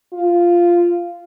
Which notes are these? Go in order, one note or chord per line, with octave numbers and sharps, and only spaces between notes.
F4